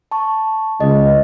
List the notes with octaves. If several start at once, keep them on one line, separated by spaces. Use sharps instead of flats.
A5 C#6
C#2 D#5